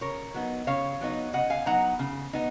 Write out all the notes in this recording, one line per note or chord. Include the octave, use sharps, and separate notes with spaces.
C#3 A#4 C#5
F#3 B3 D#4
C#3 C#5 F5
F#3 B3 D#4
C#3 D#5 F#5
F5 G#5
F#3 B3 D#4 F#5 A#5
C#3
B3 D#4